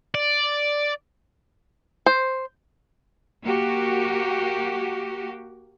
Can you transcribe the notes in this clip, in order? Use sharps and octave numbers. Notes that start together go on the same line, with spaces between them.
D5
C5
A#3 F#4 G4